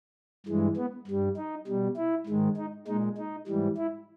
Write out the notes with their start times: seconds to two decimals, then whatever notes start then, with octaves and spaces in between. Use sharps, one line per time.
0.46 G2 E3 G#3
0.77 B3
1.07 G2 G3
1.37 D#4
1.67 B2 G3
1.96 E4
2.27 G#2 D#3 G#3
2.57 D#4
2.87 A#2 G#3 D#4
3.18 D#4
3.47 G#2 E3 G3
3.77 E4